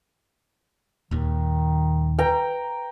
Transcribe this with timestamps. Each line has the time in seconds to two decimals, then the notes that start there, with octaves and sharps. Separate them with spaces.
1.11 D#1 D#2 D#3
2.19 B4 G5 A#5